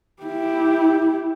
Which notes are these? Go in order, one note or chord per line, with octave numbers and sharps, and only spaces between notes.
E4 G4